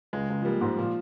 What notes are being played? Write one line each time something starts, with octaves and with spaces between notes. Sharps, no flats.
C#2 G#3
C#2
F3
G3 A#3
G#2
A#2 F3